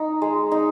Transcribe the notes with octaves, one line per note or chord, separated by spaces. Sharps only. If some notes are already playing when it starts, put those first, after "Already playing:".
Already playing: D#4
G#3
D#4